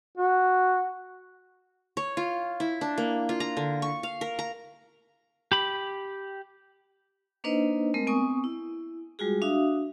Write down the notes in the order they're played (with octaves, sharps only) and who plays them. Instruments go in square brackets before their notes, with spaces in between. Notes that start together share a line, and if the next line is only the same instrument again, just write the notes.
[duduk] F#4
[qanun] C#5
F4
E4
D4
A#3
F4
A#5
D3
C#6
F5
A#4
A#5
[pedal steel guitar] G4 B5
[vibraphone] A#3 D4 D#4 B4 C5 D#5
G#3 A3 C4 A#4
B3 C4 G#5 C#6 D#6
E4
G3 G#3 F4 F#4 G#4
D4 F#4 E5 F5 D#6